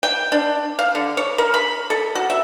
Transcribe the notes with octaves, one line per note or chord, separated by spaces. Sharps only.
G5
D4
F5
D3
C#5
A#4
B5
A4
F#4
E5